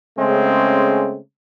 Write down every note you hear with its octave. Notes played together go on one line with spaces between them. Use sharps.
C#3 G#3 A3 C4 C#4